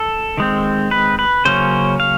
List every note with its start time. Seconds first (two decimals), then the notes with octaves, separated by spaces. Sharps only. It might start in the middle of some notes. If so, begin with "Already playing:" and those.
Already playing: A4
0.38 D#3 G#3 C4
0.91 B4
1.19 B4
1.45 C#3 F#3 A#3 C#4 C5
2.00 F5